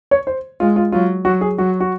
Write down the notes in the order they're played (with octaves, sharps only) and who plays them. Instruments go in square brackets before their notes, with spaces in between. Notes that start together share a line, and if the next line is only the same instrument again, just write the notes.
[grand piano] C#5
C5
[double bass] G#3 [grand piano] F4
[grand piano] F4
[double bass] F#3 [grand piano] F4
[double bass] F#3 [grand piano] F#4
[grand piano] G#4
[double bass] F#3 [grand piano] F#4
[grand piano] F#4